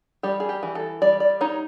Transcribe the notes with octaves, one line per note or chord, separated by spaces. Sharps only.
G3 G4
G#4
G4
E3
A4
G3 D5
D5
D#4 C#5